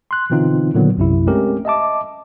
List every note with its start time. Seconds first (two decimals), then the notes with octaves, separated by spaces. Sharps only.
0.11 C6 F#6
0.30 B2 D3 E3 C4 D#4 F4
0.74 A#2 D3 D#3 F#3 B3
0.97 B1 F#2 C3 E4
1.27 G#3 A3 C4 C#4 G4 A#4
1.65 D#5 E5 A5 D6